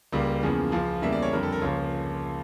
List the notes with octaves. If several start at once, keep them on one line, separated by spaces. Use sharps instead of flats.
C#2 C#3 G3 A#3
E2 C#3 F3 A#3
C#2 C#3 F3
E2 C#3 G3 A#3 E5
D5
C#5
F2 D3 G3 A#4
A4
A#4
C#2 C#3 F3 A#3 C#5